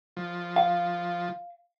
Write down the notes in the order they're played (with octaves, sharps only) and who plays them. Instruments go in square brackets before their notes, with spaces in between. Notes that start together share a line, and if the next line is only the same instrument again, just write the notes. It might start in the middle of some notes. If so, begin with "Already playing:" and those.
[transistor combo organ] F3
[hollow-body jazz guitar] F5